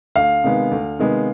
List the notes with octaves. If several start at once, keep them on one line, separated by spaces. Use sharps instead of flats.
D2 F5
C3 D#3 G#3 B3
D2
C3 D#3 G#3 B3